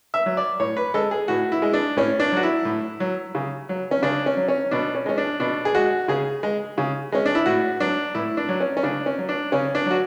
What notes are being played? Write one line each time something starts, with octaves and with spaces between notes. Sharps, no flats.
E5
F#3
D5
A2 C#5
B4
G#3 A4
G#4
A2 F#4
E4
G#3
D4
A2 C#4
D4
F#3 F#4
E4
A2
F#3
C#3
F#3
C#4
C#3 D4
C#4
F#3
C#4
B2 D4
C#4
G#3 C#4
D4
B2 D4
G#4
G#3 F#4
C#3 G#4
G#3
C#3
G#3 C#4
D4
E4
A2 F#4
F#3 D4
A2 E4
D4
F#3
C#4
C#4
C#3 D4
C#4
F#3
D4
C#3 C#4
D4
F#3 F#4